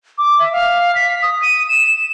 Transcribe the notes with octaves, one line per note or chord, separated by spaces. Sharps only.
D6
E5
F5
B6
D#6
D#7
E7
E7